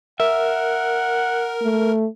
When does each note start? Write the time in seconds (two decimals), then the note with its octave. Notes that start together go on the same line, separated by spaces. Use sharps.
0.20 A#4 E5 F#5
1.63 A3